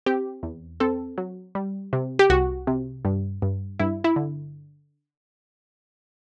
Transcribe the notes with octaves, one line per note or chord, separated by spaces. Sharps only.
C4 G4
E2
C4 A4
F#3
G3
C3
G4
C2 F#4
C3
G2
G2
G2 E4
E4
D3